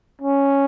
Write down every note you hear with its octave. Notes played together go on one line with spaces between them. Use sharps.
C#4